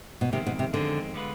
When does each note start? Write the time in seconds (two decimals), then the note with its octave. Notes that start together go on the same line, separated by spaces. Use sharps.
0.21 B2
0.32 F2 C3 D#3 G#3 C4
0.47 B2
0.59 C3
0.73 F2 D3 D#3 G#3 C4
1.14 D3 G#3 B3 F4 B4